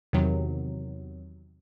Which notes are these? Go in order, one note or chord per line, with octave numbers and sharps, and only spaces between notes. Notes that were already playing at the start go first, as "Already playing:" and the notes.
E2 C3 D#3 F#3